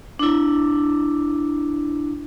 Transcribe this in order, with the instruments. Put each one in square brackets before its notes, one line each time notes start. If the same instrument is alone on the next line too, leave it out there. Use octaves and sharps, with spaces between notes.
[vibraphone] D4 E4